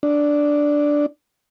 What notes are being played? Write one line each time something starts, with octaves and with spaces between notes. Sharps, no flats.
D4